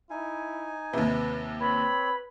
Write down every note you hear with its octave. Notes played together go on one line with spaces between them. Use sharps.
D#4 E4 G#5
D#2 C3 B4
C4 B4 C#5 B5